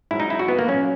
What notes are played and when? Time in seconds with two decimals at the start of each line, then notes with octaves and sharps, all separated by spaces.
0.11 G#2 F#3 E4
0.20 D#4
0.30 E4
0.39 F#4
0.48 B3
0.59 A#3
0.68 A#2 F#3 C#4